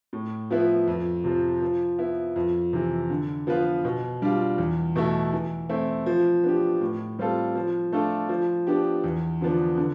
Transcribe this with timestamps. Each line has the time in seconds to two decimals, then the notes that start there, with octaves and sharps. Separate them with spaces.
0.13 A2
0.51 F3 B3 E4 B4
0.88 F2
1.24 C3 F3
1.62 F3
1.99 B3 E4
2.36 F2
2.73 C3 E3
3.10 D3
3.47 F3 B3 F4 B4
3.85 B2
4.22 G3 D4 F4
4.58 E2
4.96 B2 A3 E4
5.33 E3
5.69 A3 C4 E4
6.06 F3
6.44 B3 D4 G4
6.81 A2
7.19 G3 C4 F4 A4
7.55 F3
7.93 A3 D4 F4 A4
8.29 F3
8.67 B3 D4 G4
9.04 E2
9.41 D3 F3 B3 D4
9.77 D3